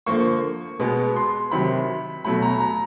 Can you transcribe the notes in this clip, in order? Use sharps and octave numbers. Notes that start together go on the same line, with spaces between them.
D3 F3 A#3 C#6
B2 G#3 B3
C6
C3 D#3 F#3 B5
B2 F#3 A3 B5
A#5
A#5